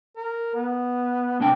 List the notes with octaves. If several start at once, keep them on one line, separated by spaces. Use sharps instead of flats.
A#4
B3
A2 C3 D4 G5